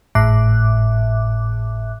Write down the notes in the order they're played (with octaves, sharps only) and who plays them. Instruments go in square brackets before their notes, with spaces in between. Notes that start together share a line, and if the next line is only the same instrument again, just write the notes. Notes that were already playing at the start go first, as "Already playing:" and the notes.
[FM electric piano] G#1 A2 E5 D6 F#6